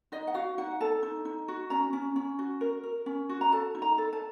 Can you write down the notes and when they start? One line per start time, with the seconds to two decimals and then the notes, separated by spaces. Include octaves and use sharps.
0.12 D#4 D#5
0.27 F#5
0.34 F#4 F5
0.58 D#4 F#5
0.81 A4 A5
1.03 D#4
1.25 D#4
1.48 F#4
1.70 C#4 A#5
1.93 C#4
2.16 C#4
2.39 F#4
2.61 A#4
2.84 A#4
3.06 C#4
3.29 F#4
3.41 A#5
3.52 A4 A5
3.75 D#4
3.82 A#5
3.98 A4
4.13 A5